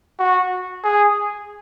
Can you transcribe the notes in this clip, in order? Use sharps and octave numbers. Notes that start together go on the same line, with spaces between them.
F#4
G#4